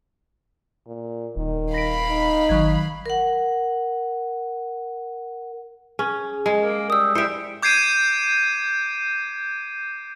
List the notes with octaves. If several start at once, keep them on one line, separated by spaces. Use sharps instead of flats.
A#2
D#1 D#3
F5 B5 A#6 B6 D7
D#4
G#1 D#3 F#3 G#6
A#4 F#5
C#4 G#4
G#3
A#3
G3 D#6 E6
G3 E4 C5 E5 C#7 D7
D6 G6 G#6 C7 D7 D#7